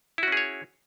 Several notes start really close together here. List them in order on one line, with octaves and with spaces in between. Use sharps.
E4 F#4 C#4 G#4 C#5